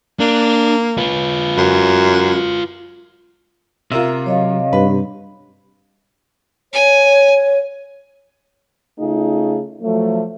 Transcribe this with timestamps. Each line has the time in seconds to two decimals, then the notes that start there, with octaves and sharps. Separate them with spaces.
0.20 A#3 D4
0.98 F4 B4
1.57 F#2
3.92 C3 F4 A#4 E5
4.26 F#3 C#5 D#5 F5
4.73 G2 B4
6.73 C#5 G#5
9.00 C#3 A3 D#4 F4 G#4
9.83 F3 F#3 A3